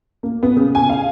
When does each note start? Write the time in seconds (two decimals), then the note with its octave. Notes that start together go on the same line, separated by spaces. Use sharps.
0.23 A#3
0.43 B3
0.57 C#3
0.75 G#5
0.89 F5